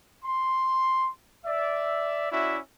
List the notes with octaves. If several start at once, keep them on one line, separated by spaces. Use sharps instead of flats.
C6
D5 E5
C#4 E4 F#4 D5 E5